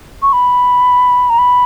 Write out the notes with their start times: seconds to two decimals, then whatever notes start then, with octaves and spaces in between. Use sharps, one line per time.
0.22 C#6
0.33 B5
1.30 A#5
1.39 B5